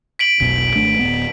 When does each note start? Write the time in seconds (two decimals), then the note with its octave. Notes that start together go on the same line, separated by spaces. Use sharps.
0.19 B6 D7 F#7
0.40 F1 B1 B2 B6
0.76 G#1 A3 D4
0.99 D1 F#2 B3